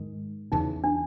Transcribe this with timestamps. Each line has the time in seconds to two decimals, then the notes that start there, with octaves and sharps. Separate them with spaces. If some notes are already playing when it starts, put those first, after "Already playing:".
Already playing: G#2 D#3 G#3
0.52 E2 C#3 E3 D#4
0.84 D4